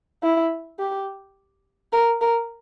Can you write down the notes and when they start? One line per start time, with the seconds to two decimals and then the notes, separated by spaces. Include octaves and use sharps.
0.23 E4
0.79 G4
1.93 A#4
2.21 A#4